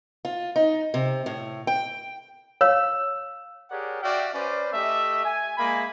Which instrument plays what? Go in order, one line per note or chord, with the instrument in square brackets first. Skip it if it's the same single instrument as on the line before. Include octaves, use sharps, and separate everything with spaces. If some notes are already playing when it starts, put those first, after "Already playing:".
[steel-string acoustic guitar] F4
D#4
C3
A2
G5
[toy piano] C#5 F5 [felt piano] E6
[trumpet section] G4 G#4 A#4 C#5 D5 F#5
F#4 D5 E5 F5 G5
C#4 B4 C5 D5
A3 G4 D#5 E5
G#5
G#3 A#3 E5 G#5 B5